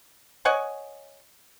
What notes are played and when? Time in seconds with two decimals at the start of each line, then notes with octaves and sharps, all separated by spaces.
0.45 C#5 D#5 F#5 G#5